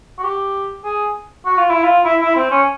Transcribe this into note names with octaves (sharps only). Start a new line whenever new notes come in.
F#4
G4
G#4
F#4
F4
E4
F4
E4
E4
C4
C#4